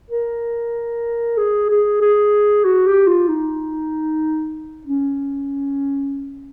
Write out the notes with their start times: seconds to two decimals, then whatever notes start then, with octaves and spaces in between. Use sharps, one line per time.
0.11 A#4
1.38 G#4
1.70 G#4
2.01 G#4
2.65 F#4
2.87 G4
3.07 F4
3.28 D#4
4.87 C#4